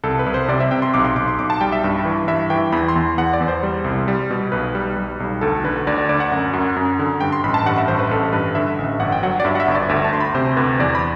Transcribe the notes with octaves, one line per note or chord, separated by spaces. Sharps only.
C2 A4
B4
C2
C5
C3 D5
E5
C3 G5
C6
B1 D6
C6
B1 D6
C6
B1 D6
A5
G3 G5
E5
G2
E3
G2 E5
E3 G5
E2 B5
C6
E2
E2 F#5
D5
E2
C5
G3
C2
G3
B2
B1 B4
G3
G3
B1
D2 A4
D3 B4
D2 D5
D5
D2 D5
F#5
F#2
F#2
F#2
D3
G2 G5
C6
A1 B5
A5
G2 F#5
E5
A1 C5
B4
A1 A4
G2 B4
D3 E5
A1
G1 F#5
G5
F#3 F#5
D5
G2 E5
F#5
E5
G1
D5
D2 E5
A5
D2 C6
B5
C3 C5
D2 B4
E2 D5
B5